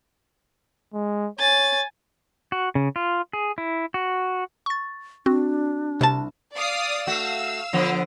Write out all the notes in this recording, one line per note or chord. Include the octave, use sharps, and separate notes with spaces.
G#3
C#5 G#5 A6
F#4
C#3
F4
G#4
E4
F#4
C#6 A6
C4 D4 F#4
C2 C3 A5
D5 F5 D#6
A3 F#4 F5 E6
D3 F3 B3